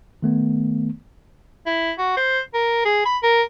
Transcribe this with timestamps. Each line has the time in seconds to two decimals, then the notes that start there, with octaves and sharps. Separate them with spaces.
0.22 D#3 A3 B3
1.67 E4
1.98 F#4
2.17 C5
2.54 A#4
2.85 G#4
3.06 B5
3.23 A#4